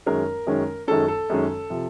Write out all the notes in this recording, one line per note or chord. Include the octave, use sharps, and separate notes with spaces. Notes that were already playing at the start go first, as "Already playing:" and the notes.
F#2 D#3 G#3 C#4 A#4
F#2 D#3 G#3 C#4
F#2 D#3 G#3 C#4 A4
A4
F#2 D#3 G#3 C#4
C3 F3